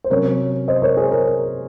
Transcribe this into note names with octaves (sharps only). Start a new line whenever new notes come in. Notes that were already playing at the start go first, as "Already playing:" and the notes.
C5
C3 F#3 C#4 A#4 C#5
C5 D#5
A#4 C#5
G#4 C5
A#4
A#4